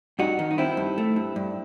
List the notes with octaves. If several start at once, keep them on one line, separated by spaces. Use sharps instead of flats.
G2 D#4 F#4
D#3
D#4
D#3 C4 E4
G2
A3
G2
G2